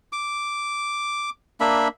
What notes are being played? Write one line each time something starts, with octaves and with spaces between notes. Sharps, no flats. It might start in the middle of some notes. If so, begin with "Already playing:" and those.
D6
A#3 D4 E5 B5